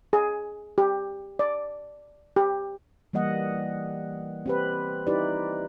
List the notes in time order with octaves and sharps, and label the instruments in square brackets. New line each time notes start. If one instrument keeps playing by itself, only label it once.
[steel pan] G#4
G4
D5
G4
[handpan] E3 G3 A#3 D#5 F#5
C4 G4 B4
D#4 E4 G4 B4 D5